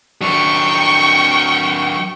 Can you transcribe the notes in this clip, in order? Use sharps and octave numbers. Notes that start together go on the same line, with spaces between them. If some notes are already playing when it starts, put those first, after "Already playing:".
F#3 D4 G5 C#6